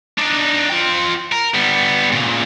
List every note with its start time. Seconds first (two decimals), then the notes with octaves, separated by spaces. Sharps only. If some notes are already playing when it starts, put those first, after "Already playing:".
0.18 D4 D#4
0.69 F4 G5
1.32 A#4
1.54 G3 B3
2.12 A#2 C#3